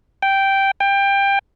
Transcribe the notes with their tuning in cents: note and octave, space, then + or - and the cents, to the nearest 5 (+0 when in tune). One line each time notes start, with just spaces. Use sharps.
G5 -5
G5 +20